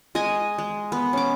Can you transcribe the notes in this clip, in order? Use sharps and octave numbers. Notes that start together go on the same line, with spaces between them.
G#3 D#5 G#5
G#3
B3
C#4 D6